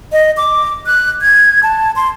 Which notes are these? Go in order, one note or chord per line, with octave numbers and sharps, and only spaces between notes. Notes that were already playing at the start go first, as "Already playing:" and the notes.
D#5
D6
F#6
G#6
A5
C6